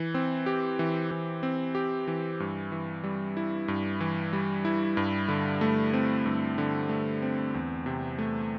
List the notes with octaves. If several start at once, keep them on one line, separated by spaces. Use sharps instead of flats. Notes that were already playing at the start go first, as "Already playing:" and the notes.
Already playing: E3
C4
G4
E3
E3
C4
G4
E3
G2
E3
G3
E4
G2
E3
G3
E4
G2
D3
A3
C4
G2
D3
A3
C4
E2
C3
A3